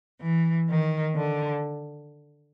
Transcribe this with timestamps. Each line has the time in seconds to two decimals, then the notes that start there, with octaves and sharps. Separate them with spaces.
0.21 E3
0.68 D#3
1.14 D3